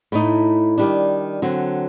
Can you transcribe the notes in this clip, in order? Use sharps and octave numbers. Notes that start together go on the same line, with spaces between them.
A2 A3 D#4
D#3 G3 D4
D3 F#3 C4